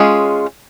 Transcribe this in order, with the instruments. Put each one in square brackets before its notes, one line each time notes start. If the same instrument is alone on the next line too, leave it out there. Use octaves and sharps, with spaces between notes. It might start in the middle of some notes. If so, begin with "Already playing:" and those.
Already playing: [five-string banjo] G#3 C#4 F4 G#4